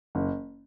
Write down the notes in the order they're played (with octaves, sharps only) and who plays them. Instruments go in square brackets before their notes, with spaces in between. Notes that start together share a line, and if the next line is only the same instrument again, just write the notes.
[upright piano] F#1